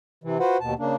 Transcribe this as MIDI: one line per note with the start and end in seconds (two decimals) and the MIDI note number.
0.24 0.38 48
0.24 0.38 52
0.39 0.57 65
0.39 0.57 66
0.39 0.57 71
0.39 0.57 72
0.39 0.57 78
0.61 0.74 39
0.61 0.74 47
0.61 0.74 81
0.79 0.96 49
0.79 0.96 58
0.79 0.96 62